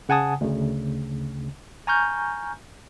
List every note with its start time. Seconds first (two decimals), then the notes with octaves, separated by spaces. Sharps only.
0.09 C#3 F#5 G#5 A5 D#6
0.41 D2 C#3
1.87 G#5 A#5 C#6 F6 G6